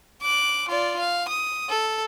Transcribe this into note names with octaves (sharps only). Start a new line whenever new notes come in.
D6 F#6
F4 D5
F5
D#6
A4